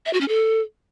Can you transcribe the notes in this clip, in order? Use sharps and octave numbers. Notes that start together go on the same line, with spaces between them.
E5
F#4
C#4
A4